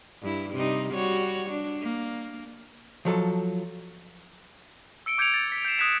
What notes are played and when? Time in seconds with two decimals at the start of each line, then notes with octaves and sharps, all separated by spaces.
0.21 G2 E4
0.54 C3 G3 D#4
0.93 G3 F#4 C#5
1.50 D4
1.81 A#3
3.05 F3 F#3 A4
5.06 E6 C#7 D7 G7
5.18 D6 G6 G#6 C#7 D7 F7
5.34 A6
5.52 B6
5.65 G6 C7 E7
5.79 D#6 F#6 G#6 B6 E7